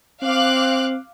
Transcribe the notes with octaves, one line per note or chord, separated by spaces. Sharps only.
C4 F5 D6 F#6